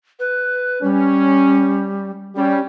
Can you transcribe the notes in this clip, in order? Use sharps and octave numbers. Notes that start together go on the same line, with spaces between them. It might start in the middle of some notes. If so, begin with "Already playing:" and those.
B4
G3 C#4
G3 C#4 G4